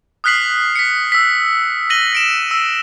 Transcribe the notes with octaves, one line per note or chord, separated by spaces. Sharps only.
D#6 F6 F#6 B6 C7 F#7
B6 C#7
E6 B6
A#6 D#7 F#7 G7
A#6 D7 E7
E6